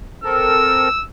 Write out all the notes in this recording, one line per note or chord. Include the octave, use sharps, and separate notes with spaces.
C4 A4 A#4 E6